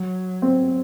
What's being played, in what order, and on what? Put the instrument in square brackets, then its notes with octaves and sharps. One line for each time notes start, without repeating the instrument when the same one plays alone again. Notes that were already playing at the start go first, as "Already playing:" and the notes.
Already playing: [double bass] F#3
[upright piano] C4